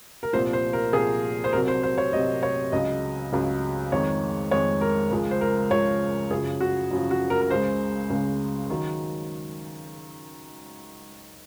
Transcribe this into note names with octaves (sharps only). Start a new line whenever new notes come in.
A#4
C2 A#2 F3 C5
C5
A#4
C2 A#2 F3 G#4
C5
C2 C3 F#3 A#4
C5
C5
C#5
C2 C3 F#3 D#5
C#5
C#2 C#3 F#3 D#5
C#2 C#3 F#3
F2 D#3 G#3 C#5
F2 D#3 G#3 C#5
A#4
C#2 C#3 F3 G#3
C5
A#4
C#2 C#3 F3 G#3 C#5
F#2 C#3 F3 G#4
F#4
F#2 C#3 F3
F#4
A#4
A#4
C#2 C#3 G#3 C5
C#2 C#3 G#3
D#3 F#3